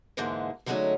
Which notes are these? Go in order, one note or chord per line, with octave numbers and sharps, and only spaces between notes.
G#2 D3 E3 G#3 A#3
D3 F#3 G#3 A3 C#4 D#4